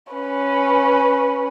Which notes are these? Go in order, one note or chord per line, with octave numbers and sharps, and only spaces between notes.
C#4 B4